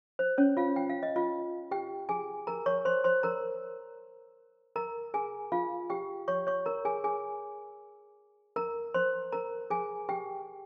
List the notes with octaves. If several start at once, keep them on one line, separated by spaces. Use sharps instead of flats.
C5
C#4 C#5
F4 F5
G5
F5
D#5
F4 F5
G4 G5
G#4 G#5
A#4 A#5
C#5 C#6
C5 C6
C5 C6
A#4 A#5
A#4 A#5
G#4 G#5
F4 F5
G4 G5
C#5 C#6
C#5 C#6
A#4 A#5
G#4 G#5
G#4 G#5
A#4 A#5
C5 C6
A#4 A#5
G#4 G#5
G4 G5